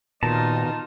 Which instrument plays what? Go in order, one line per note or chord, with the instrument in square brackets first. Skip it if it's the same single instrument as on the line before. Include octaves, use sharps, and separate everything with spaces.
[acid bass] A#2 [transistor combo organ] D#3 B3 F#4 [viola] D#4 F4 [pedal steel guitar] A5 A#5